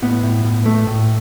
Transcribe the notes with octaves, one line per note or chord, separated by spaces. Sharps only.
A2 B3
A2
A2
A2 A3
A2